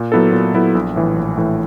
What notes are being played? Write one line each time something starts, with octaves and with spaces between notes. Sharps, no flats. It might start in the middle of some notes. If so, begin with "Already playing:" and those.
Already playing: A#2
F#3 B3 E4 A4
A#2
F#3 B3 E4 A4
A#1
A2 E3
A#1
A2 E3